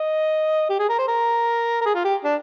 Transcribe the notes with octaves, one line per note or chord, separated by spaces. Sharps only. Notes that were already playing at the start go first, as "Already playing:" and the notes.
Already playing: D#5
G4
G#4
A#4
C5
A#4
A#4
G#4
F4
G4
D4